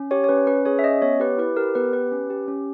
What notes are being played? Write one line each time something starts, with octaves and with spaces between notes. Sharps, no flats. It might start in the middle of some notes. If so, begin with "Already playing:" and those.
Already playing: C#4
G4 C#5
C#5
C#4 B4
C#4 B4
G#4 C#5
E5
C#4 D#5
B3 C#5
G4 B4
E4 B4
G4 A#4
B3 B4
G4 B4
C#4
G4
C#4